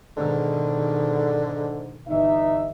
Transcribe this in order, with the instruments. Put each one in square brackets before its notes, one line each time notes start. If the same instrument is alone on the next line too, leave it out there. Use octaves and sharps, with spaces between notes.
[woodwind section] G#2 D3 [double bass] B2 D#3
[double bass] G1 E3 [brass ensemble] D#4 E5